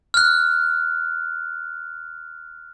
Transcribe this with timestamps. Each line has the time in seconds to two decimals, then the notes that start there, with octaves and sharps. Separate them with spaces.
0.14 F6 F#6